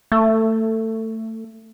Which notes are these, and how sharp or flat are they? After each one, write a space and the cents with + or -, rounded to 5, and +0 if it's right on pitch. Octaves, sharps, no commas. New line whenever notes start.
A3 +20